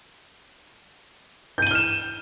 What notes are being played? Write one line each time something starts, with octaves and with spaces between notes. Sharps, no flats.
F6 G6 D#7 E7 G7